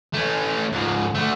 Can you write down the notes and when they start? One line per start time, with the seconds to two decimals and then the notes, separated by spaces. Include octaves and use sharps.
0.13 A3 C#4
0.72 G#2 F3
1.15 A3 F#4